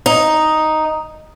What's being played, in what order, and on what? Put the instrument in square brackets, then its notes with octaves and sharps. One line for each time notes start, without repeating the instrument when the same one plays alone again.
[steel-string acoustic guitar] D#4